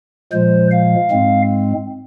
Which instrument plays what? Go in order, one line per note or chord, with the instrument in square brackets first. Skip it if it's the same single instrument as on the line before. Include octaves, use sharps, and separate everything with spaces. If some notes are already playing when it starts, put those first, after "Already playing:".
[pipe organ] A#2 F3 G#3 C5
F5
G#2 G#3 C4